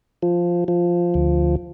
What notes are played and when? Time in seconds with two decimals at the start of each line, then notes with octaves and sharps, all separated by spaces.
0.23 F3
0.68 F3
1.14 D2